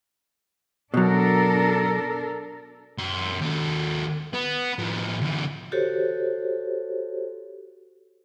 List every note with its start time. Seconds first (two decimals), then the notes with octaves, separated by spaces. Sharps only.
0.94 B2 F#3 D4 A4 A#4
2.98 F#2 C6
3.41 D#2 A4
4.34 B3
4.79 A2 F3
5.22 D2 E3
5.72 F#4 G4 A4 C5 C#5